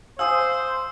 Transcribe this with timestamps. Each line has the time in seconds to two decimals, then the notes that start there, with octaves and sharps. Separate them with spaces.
0.19 C5 F5 G#5 D#6 E6